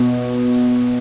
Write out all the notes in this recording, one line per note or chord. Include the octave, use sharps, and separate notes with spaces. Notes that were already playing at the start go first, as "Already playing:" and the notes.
Already playing: B2